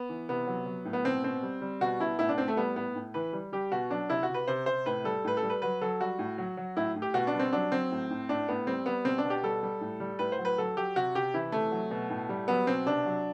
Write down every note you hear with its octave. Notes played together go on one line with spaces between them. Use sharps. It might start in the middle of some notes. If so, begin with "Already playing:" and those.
Already playing: B3
E3
C3 B3
F#3
F#3
A2
B3
B2 C4
B2 C4
G3
G3
B2 F#4
B2 E4
A2 E4
D4
A2 C4
A3
G3 B3
A2 B3
A2
E3 B4
G3
G3 G4
B2 F#4
F#3 D4
C3 E4
F#4
C3
B4
C3 C5
C3 C5
A2 B4
G3 A4
A2 B4
A4
G3
B4
F#3 B4
F#3 A4
G3 F#4
A2
F#3
F#3
A2 E4
A2
G4
B2 F#4
D4
G3
C4
F#3 D4
F#3 C4
A2
A2
A2 D4
A2 B3
G3 C4
G3 B3
B2 C4
D4
B2
G4
G3 A4
G3
A2
G3
A2 B4
C5
F#3
B4
F#3 A4
F#3 G4
C3 F#4
C3 G4
E3 E4
C3 A3
F#3
B2
A2
G3
F#3 B3
B2 C4
C3 D4
F#3